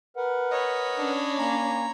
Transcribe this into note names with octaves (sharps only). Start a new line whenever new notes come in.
A#4 B4 F#5
C#5 D#5 B5
C#4 D4
A#3 G#5 A#5